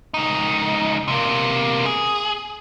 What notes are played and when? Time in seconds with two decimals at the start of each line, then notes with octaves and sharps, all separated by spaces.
0.14 C#2 D#4
1.08 C3 A#3
1.86 G#4